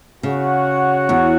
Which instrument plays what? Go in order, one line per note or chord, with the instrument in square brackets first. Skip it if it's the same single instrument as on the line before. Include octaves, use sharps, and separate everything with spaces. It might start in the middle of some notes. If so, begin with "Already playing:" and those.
[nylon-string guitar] C#3 [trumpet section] F#4 C#5 F#5
[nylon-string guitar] E2